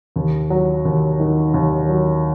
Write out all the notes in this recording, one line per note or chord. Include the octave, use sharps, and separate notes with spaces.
D#2
F#3
D#2
D#3
D#2
F#3